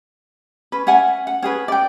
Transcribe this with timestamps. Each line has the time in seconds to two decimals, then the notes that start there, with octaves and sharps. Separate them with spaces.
0.72 C#4 B4
0.87 C#4 E5 F#5 G#5
1.27 F#5
1.42 C#4 G#4 B4
1.68 D5 G5